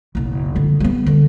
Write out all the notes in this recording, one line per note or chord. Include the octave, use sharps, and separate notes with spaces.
F#1 B1
D3 F3
G3 B3
D3